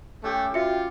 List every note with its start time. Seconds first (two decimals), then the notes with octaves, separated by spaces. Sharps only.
0.24 A3 C#4 G4 G5
0.54 F4 F#4 E5 C#7